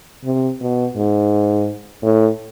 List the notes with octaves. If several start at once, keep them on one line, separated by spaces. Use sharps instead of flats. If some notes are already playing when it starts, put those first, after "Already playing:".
C3
B2
G#2
A2